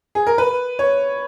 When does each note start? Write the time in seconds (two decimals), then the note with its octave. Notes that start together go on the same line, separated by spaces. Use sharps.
0.15 G#4
0.27 A#4
0.38 B4
0.79 C#5